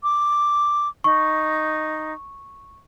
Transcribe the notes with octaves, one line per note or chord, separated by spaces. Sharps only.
D6
D#4 C#6